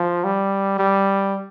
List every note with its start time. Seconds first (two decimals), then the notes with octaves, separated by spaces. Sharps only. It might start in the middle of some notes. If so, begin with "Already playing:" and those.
Already playing: F3
0.24 G3
0.79 G3